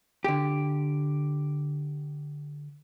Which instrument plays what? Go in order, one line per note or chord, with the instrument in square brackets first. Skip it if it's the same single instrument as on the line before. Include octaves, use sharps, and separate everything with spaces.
[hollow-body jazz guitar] D3 G4